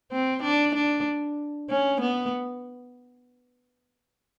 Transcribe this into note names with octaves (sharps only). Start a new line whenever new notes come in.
C4
D4
D4
C#4
B3